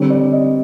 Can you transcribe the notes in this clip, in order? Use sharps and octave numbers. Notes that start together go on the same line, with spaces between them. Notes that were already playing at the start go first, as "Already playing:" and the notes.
Already playing: D3 G3 C4 C#5
D5
D#5